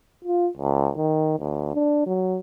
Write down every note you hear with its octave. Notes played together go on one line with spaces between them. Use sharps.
F4
C#2
D#3
D2
D4
F#3